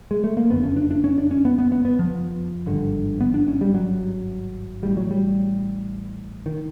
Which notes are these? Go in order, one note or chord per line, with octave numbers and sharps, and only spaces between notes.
G#3
A3
A#3
F#1 F2 D3 B3
C#4
D4
D4
C#4
D4
C#4
B3
B3
B3
B3
F3
G#1 G2 D3
B3
D4
C#4
G3
F#3
A1 A2 G3
F#3
G3
D#3